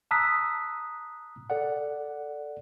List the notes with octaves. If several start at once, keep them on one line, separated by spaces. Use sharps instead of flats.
A5 A#5 D#6 E6 F#6 B6
A4 D5 F#5